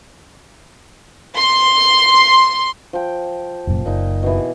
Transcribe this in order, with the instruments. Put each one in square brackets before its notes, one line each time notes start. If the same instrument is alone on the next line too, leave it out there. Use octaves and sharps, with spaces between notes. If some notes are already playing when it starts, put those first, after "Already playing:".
[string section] C6
[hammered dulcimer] F3 G5
[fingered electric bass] F1 F#2 A#2
[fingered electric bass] F#1 [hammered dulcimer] A#2 D#4
[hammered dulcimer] B2 E3